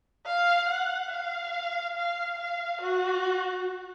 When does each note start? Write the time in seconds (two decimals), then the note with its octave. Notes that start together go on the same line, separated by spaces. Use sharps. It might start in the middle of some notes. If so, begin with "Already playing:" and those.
0.26 F5
0.68 F#5
1.11 F5
1.97 F5
2.39 F5
2.82 F#4